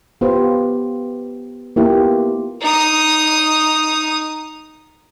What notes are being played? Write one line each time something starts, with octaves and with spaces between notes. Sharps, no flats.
B3 F4 G4 B4 C5
A#3 B3 E4 F4 G4
D#4 D#6